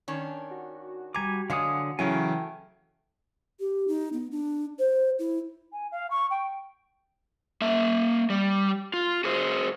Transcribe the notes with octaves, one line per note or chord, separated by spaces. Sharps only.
D#3 C#4 D4
F#4
G3 G#5 A#5 D6
D3 F#3 G#3 F5 G#5 D#6 C#7
C#3 E3 F#3 A3 C#4 G5 G#5
G4
D#4
B3
D4
C5
E4
G#5
F5
C#6
G5
A#3 E5
G3
F4
F#4 G#4 C5